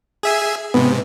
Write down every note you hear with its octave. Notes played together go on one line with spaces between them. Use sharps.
G#4 E5 G#5
G#2 C3 B3